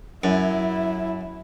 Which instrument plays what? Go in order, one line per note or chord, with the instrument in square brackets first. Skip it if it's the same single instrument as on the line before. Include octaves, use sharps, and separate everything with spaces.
[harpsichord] F#2 [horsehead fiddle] E4